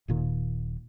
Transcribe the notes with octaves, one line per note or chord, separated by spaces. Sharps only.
D#1 A#2 D#3